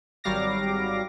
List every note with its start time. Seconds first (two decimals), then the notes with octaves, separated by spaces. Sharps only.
0.24 G#1 F#3 G3 F5 D6 A#6